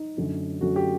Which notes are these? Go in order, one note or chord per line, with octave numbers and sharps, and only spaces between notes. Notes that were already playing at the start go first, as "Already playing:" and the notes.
Already playing: D#4
F#2 D3 F#3 A3
F#2 D3 F#3 A3 F#4
G4